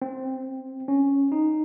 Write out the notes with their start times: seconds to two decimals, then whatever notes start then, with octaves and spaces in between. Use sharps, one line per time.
0.02 C4
0.88 C#4
1.32 D#4